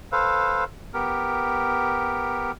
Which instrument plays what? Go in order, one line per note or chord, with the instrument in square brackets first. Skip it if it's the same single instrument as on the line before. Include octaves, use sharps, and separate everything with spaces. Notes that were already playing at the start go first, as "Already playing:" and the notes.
[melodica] A4 B4 C5 F5
B3 G4 A#4